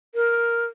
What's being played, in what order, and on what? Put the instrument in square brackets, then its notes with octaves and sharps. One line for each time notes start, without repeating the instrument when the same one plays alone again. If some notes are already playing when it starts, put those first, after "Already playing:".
[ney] A#4